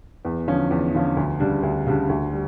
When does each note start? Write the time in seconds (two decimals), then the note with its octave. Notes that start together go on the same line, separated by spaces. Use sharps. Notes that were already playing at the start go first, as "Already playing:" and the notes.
0.25 E2
0.48 D3 F3 C#4
0.71 E2
0.94 D3 F3 C#4
1.17 D2
1.40 C#3 G3 D4
1.63 D2
1.87 C#3 G3 D4
2.09 D2
2.33 G3